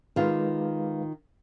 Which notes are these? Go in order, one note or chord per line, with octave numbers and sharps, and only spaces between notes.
D#3 G#3 F4 B4 F5